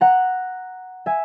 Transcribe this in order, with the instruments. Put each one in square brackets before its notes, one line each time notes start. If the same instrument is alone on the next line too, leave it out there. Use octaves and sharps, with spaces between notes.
[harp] F#5 A#5
E5 G#5